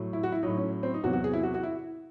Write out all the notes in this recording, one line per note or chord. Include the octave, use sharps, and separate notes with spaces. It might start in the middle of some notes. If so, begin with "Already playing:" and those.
Already playing: A2 F#3
E4
F#4
E4
A2 F#3 D#4
C#4
C4
D#4
E2 C3 F#3 F#4
F#4
G#4
E4
F#4
F#4
E4